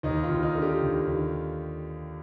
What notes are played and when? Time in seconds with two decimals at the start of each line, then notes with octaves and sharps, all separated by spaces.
0.03 D#2 D#4
0.23 F4
0.30 D#2
0.43 D#4
0.55 D3
0.62 G4
0.82 D#2
1.07 D#2